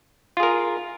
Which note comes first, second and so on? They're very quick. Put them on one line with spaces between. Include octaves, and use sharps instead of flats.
F4 G#4 A#4